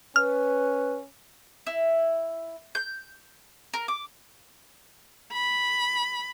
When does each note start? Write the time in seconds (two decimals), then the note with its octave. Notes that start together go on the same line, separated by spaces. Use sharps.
0.16 C#4 B4 F6
1.67 E4
2.75 G6
3.74 A#4
3.88 D6
5.32 B5